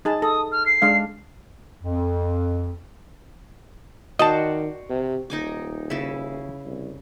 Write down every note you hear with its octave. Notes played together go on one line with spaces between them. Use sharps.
D#4 G#4 A5
A4 D#6
F6
C7
G#3 D4 F5
F2
D#3 F#4 C5 D5 D#5 A5
C3
D#1 D#4 G#5 D6
C#3 E4
C2